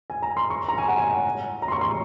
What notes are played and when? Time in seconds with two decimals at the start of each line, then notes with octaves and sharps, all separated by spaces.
0.10 G#5
0.22 A#5
0.37 C6
0.50 C#6
0.69 A#5
0.78 G#5
0.88 F#5
0.98 G#5
1.62 A#5
1.68 C6
1.72 C#6
1.81 C6